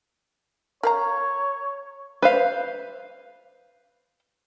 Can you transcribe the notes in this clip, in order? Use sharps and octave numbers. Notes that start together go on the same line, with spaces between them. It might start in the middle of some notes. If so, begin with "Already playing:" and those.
A#4 C#5 F5 A#5
B4 C5 F5